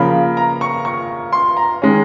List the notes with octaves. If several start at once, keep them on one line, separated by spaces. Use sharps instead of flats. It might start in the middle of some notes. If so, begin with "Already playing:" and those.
Already playing: C#3 F3 A#3 B5
A#5
C#6
C#6
C6
A#5
D#3 G#3 C#4